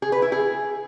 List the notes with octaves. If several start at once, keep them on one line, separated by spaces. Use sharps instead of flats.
G#4
B4
E4
G#4